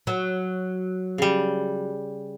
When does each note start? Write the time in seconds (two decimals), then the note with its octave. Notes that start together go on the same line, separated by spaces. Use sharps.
0.07 F#3 F#4
1.18 C#3 G3